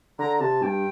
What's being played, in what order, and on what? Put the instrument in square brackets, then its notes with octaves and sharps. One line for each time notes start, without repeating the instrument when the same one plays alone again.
[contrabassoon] D3 [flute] A#5
[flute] A#5
[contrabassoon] C3 [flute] A5
[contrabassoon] G2 [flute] G5